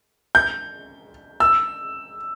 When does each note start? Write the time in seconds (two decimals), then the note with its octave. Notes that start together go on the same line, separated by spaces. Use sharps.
0.35 G6
1.40 E6